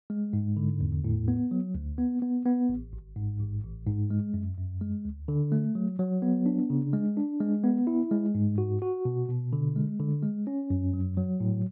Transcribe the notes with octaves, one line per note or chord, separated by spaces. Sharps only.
G#3
G#2
D3
E2
A2
B3
F#3
D2
B3
B3
B3
A1
G#1
G#2
A1
A1
G#2
G#3
F#2
F#2
G#3
D2
D3
A3
F#3
F#3
B3
D4
C#3
G#3
D4
G#3
B3
E4
G#3
G#2
F#4
F#4
B2
B2
D3
G#3
D3
G#3
C#4
F#2
F#3
F#3
A2